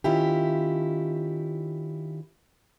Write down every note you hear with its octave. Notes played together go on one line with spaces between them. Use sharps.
D#3 C#4 E4 F4 G4